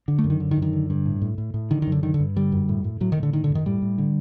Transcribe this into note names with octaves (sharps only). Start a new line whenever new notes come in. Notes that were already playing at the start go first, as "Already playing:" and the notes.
D3
A3
F#2
D#3
D3
D#3
F#2
D#3
D3
G2
A2
A2
A2
A2
D3 D#3
D#3
F#2
D3
D3 D#3
D3
G2
D3 G3
F#2
A2
A2
A2 F#3
D#3
A2
D3
D3 D#3
D3
F#2
D#3
A2 G3
A2
D3